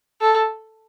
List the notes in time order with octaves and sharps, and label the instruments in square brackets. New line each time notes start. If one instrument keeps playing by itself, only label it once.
[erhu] A4